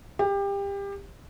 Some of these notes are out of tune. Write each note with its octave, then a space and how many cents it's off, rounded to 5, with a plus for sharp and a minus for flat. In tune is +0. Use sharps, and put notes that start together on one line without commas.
G4 +25